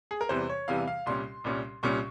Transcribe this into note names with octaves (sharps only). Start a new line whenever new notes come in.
G#4
A#4
E2 C3 E3 G3 C5
C#5
E2 C3 E3 G3 F5
F5
C2 A#2 G3 C#4 C6
C2 A#2 G3 C#4
C2 A#2 G3 C#4 C#6